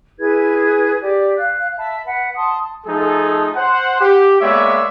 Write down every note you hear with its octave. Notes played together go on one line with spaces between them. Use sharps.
E4 G#4 B4 G#6
G4 D5
F5 F#6
E5 A5 B5
B4 F#5
A5 C6 D#6
F3 A3 D#4 G#4 A4
C5 F#5
G4
G#3 A#3 B3 C#5 D5 E5